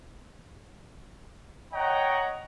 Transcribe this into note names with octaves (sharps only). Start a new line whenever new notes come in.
C#5 D#5 F#5 G5 A#5